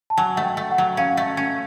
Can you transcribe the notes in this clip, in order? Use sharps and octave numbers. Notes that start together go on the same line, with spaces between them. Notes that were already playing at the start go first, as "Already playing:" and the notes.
A5
F#3 G#5
A3 F#5
G5
A3
F#5
F#3
C#4 F5
A3
C#4